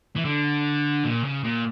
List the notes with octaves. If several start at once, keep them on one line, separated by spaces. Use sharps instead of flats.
E3
D3
A#2
C#3
A#2